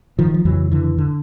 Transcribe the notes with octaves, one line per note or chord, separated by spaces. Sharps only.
D#3 F3
F3
F2 C#3 E3 F#3
D3 E3
D3